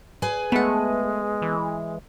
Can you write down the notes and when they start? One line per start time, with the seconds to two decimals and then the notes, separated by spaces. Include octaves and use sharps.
0.22 G#4 B4 G#5
0.52 G#3 A3 B3 F#5
1.42 E3